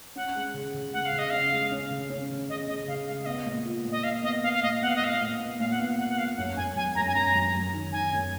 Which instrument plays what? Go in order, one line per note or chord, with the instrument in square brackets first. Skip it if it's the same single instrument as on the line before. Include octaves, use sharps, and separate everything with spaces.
[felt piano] C#4 [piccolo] F#5
[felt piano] G#3
C#3
C#3
[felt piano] G#3 [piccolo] F#5
[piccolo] F5
[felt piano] C#3
[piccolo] D#5
[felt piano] C#4 [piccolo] F5
[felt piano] G#3
C#4
C#3
C#4
C#3
[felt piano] C#3 [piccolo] D#5
[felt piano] C#3 [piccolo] D#5
[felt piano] C#3 [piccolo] F5
[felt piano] G#3 [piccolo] F5
[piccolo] F5
[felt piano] B3 [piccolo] D#5
[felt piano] A#2
F4
A#2
[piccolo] D#5
[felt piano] A#2 [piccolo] F5
[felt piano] B3 [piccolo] D#5
[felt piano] B3 [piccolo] F5
[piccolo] F5
[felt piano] A#2 [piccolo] D#5
[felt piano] B3 [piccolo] F#5
[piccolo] F5
D#5
[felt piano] A#2 [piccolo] F5
[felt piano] A#2
B3
[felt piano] A#2 [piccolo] F5
[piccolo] F#5
[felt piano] B3 [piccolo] F5
[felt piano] B3 [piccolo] F#5
[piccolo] F#5
[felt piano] B3 [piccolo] F5
[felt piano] F#2 [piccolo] F#5
[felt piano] F#2 [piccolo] G#5
[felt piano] F#3 [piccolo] G#5
[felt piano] F#2 [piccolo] A#5
[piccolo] G#5
[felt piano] F#2 [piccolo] A#5
[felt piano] F#3
F#3
D#3
[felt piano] D#3 [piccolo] G#5
[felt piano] F#2